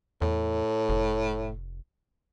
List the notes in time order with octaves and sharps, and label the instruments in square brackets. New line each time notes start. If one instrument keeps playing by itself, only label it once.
[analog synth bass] E2 [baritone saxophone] A2
[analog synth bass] F1